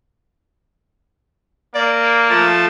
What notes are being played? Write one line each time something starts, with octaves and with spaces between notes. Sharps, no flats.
A#3 D5
F3 A3 A5